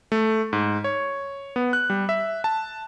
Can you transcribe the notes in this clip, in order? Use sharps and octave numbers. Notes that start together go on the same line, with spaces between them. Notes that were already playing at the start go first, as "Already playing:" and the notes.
A3
G#2
C#5
B3
F#6
G3
E5
A5